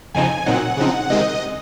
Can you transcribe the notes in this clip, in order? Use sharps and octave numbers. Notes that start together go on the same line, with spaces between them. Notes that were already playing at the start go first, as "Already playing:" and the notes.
F2 C#3 F3 C4 D#4 G#5
A#2 F#3 C4 D#4 F#5
C#3 F3 C4 D#4
C3 D#3 G#3 C4 D#4 D#5